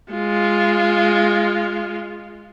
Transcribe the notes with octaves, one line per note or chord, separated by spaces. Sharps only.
G#3 F4